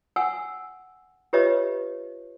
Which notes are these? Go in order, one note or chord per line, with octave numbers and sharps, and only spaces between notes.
F#5 G#5 E6
F4 G4 B4 C#5 D#5 E5